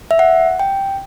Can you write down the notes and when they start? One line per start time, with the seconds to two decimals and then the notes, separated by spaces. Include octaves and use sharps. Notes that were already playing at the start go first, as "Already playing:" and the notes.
0.11 E5
0.19 F#5
0.59 G5